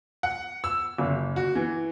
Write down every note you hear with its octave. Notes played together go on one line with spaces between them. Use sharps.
F#5
E6
F#1
F#4
E3